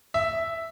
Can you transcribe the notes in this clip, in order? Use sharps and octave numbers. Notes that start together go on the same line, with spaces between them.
E5